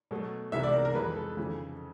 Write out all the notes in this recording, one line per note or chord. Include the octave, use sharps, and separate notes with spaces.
B2 F#3 A3
C2 C3 E3 G#3 B3 E5
D5
A#4
A#4
F2 C3 E3 G#3 B4
A4
F2 C#3 E3